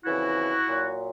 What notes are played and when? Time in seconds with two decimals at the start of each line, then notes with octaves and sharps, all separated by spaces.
0.05 F2 C#3 E3 E4 F#4
0.67 A#2 F#3